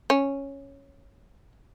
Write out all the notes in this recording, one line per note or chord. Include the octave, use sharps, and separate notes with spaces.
C#4